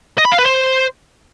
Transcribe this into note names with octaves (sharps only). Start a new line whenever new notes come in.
D#5
B5
F5
B4
C5